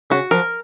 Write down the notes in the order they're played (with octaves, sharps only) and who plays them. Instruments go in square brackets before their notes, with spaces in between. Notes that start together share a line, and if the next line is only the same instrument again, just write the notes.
[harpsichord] C#3 [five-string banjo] F#4
[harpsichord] F3 [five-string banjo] A#4